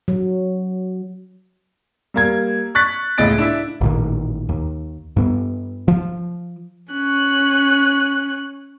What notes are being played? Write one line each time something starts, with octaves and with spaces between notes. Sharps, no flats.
F#3
G3 A#3 G#6
C#6 F#6 A6 B6
C#2 A2 D#5 A6 D7
D4 E4 E5
A1 A#2 D#3
D#2
G2 B3
F3
C#4 F#6